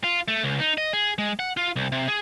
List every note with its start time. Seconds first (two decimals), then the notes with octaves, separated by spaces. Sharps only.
0.04 F4
0.28 A3
0.43 C#2
0.60 D#4
0.78 D#5
0.93 G#4
1.18 G#3
1.39 F#5
1.57 F4
1.76 C2
1.92 C3
2.08 G#4